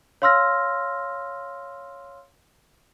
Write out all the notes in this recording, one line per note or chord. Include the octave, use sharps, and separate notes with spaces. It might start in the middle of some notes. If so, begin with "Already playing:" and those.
C#5 F5 C6 E6 F6 A#6